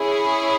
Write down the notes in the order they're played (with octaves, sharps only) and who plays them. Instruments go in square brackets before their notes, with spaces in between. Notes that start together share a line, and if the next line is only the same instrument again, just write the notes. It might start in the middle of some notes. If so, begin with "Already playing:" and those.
Already playing: [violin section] C#4 E4 G#4